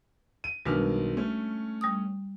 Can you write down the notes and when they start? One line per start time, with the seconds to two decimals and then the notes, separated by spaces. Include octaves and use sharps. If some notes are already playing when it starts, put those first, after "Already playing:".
0.44 D#7
0.65 B1 D#3 G3 G#3 D4 F6
1.17 A3 C#4
1.81 G3 D#6